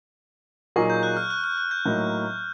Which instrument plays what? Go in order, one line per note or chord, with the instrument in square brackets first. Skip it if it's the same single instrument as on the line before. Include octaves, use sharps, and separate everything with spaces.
[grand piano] A#2 F#3 A#3 D#4 G#4 [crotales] C#6
[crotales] G6
F#6
F6
F#6
F6
F#6
G6
[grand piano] A2 F#3 A#3 D#4